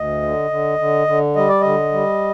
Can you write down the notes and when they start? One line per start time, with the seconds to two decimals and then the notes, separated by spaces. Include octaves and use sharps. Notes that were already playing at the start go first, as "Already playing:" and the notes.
Already playing: D2 D#5
0.22 D3
0.51 D3
0.79 D3
1.07 D3
1.36 G3 D#5
1.49 D5
1.61 D3 D#5
1.93 G3